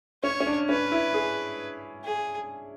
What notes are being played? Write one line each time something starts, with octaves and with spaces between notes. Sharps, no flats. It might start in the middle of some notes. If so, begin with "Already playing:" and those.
C#4 C#5
C#4
D4
C#4 B4
E4
G#4
G#4